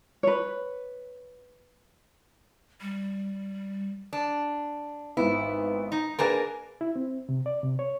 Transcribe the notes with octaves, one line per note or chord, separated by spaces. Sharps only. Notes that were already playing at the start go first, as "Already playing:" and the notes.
B4 C#5
G3
D4
G#1 B3 E4
D#4
A#3 D4 G#4 A#4 B4 G#5
E4
C4
C3
D5
C3
C#5